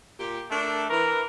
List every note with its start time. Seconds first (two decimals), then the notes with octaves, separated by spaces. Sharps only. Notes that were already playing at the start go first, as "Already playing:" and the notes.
0.17 A#2 G4
0.50 A3 D4 A#4 D5
0.90 E3 A#4